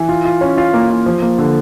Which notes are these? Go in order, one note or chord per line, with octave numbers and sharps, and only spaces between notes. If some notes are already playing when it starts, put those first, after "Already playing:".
Already playing: E3
F4
F4
C#4
F4
A#3
F4
F3
A#3
D3